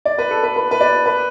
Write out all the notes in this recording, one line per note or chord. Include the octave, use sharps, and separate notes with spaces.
D5
B4
A4
B4
B4
B4
D5
B4